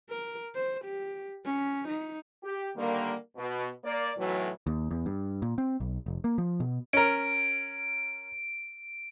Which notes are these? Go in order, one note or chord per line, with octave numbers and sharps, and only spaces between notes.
A#4
C5
G4
C#4
D#4
G4
D3 D#3 G3 A#3
B2
A#3 D5
B1 A2 E3 F#3
D#2
E2
G2
A#2
C4
B1
F1
A#3
F3
B2
C#4 A#4 D7